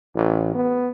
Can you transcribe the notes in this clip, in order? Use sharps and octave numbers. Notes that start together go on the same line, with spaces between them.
A1
B3